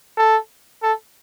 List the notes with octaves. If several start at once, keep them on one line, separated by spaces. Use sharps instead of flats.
A4
A4